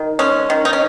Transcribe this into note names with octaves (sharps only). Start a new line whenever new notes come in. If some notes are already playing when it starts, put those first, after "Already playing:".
Already playing: D#3
G#3 C#4
D#3
D#4
C#4